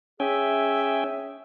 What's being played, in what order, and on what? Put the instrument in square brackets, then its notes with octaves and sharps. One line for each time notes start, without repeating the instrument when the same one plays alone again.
[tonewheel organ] C#4 G5 G#5 [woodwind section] G#4 E5